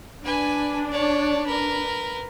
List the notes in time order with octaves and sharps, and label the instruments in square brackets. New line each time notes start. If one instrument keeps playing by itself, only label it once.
[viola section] D4 [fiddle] B4 G#5
[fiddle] C#5 D5
A#4 B4